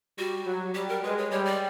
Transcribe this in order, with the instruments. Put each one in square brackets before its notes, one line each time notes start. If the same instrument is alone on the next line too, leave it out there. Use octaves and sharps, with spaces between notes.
[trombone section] G3 [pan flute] F#4
[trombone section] F#3
[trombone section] G3 [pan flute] G4
[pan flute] A#4
[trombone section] G#3 [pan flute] B4
[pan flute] C#5
[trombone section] G3 [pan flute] C#5
[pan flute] D5